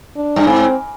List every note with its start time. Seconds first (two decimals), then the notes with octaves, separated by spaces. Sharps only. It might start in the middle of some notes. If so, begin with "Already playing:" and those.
0.16 D4
0.36 G2
0.47 G#2 C4